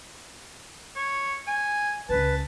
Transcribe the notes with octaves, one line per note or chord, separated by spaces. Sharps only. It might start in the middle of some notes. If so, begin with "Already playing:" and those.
C#5
G#5
C#2 E4 B4 A5